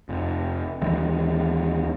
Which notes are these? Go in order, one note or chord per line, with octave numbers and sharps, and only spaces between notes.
F1
D#2 E3 G#3